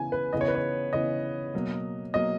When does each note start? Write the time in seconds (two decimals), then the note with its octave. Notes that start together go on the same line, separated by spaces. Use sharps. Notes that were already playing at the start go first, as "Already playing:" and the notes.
Already playing: C#3 E3 B3 G#5
0.12 B4
0.33 C#3 E3 B3 D#5
0.41 C#5
0.48 B4
0.55 C#5
0.93 C#3 E3 B3 D#5
1.54 B2 F#3 A#3
2.14 B2 F#3 A#3 D#5